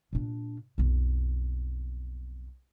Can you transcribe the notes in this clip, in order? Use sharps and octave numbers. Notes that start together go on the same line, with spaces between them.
A#2 D4
B1 F2